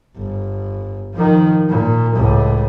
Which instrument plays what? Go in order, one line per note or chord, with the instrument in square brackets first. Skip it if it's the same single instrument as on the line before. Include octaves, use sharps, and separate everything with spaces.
[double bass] G1
D#3 F3
A#2
C#2 A2